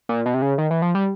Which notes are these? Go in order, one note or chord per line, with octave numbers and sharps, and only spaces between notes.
A#2
B2
C3
C#3
D#3
E3
F3
G3